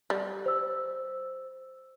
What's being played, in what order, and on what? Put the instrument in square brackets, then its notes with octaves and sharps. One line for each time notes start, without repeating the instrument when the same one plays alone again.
[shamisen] G3
[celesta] C5 E6